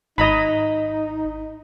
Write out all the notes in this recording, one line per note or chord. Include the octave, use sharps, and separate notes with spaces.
G#1 D#4 D#5 A#5 B5